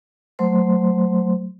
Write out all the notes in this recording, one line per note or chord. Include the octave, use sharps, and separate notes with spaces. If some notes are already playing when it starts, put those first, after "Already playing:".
F#3 A3 C5 C6